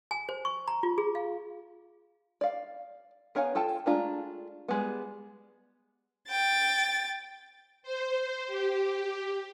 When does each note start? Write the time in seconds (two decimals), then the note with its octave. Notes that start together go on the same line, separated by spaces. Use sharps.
0.11 G#5
0.29 C5
0.45 C#6
0.68 A#5
0.83 F4
0.98 G#4
1.15 F5
2.41 D5 F5
3.35 B3 A#4 C#5 F5 G#5
3.55 F4 A4 G5 A5
3.86 G#3 A3 D4 F4 A#5
4.68 G3 G#3 B3
6.29 G5 A6
7.83 C5
8.47 G4